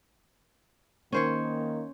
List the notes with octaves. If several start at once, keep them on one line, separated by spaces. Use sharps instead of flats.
D#3 A#3 C#4 C5 C#5